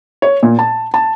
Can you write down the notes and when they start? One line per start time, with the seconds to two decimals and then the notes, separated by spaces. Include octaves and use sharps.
0.22 C#5
0.43 A#2
0.59 A5
0.94 A5